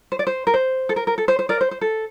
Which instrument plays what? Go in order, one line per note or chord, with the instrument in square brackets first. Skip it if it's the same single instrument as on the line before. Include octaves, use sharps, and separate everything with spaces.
[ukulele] C5
D5
C5
A#4
C5
A4
A#4
A#4
A4
C5
C5
A#4 D5
C5
C5
A4